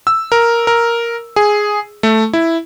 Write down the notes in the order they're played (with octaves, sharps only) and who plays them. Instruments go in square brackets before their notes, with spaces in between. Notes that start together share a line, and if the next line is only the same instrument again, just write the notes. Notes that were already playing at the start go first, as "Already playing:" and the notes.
[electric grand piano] E6
A#4
A#4
G#4
A3
E4